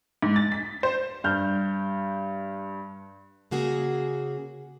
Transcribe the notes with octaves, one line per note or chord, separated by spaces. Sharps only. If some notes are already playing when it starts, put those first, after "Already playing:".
G#2
A6
B6
C5
G2 F6 G6
C#3 A#3 F#4 G#4